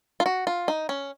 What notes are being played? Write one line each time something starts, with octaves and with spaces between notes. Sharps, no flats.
F4
F#4
F4
D#4
C#4